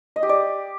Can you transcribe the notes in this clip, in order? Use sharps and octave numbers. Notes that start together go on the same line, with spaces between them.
D#5
G4
D5